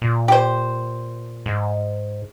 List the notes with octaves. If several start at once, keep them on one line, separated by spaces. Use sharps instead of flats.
A#2
G4 C5
G#2